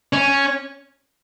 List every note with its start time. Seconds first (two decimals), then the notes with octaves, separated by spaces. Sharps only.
0.13 C#4